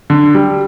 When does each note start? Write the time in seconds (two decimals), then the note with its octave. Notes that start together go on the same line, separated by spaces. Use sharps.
0.10 D3
0.34 G3